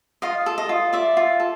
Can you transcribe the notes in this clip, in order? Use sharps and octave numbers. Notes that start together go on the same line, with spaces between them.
F4 D#5 F5
A4
D#5
F4
D5 E5
F4
A4